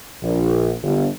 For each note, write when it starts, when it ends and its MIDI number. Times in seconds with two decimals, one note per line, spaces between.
0.23 0.74 34
0.82 1.07 31